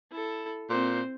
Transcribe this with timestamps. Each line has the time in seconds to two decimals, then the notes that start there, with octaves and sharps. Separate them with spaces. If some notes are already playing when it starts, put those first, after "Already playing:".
0.11 E4 A4
0.70 A#2 C4 C5